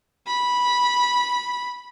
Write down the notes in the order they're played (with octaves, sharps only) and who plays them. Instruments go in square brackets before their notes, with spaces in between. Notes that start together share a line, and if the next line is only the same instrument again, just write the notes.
[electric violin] B5